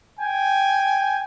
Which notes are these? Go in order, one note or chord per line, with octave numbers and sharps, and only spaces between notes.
G5 G#5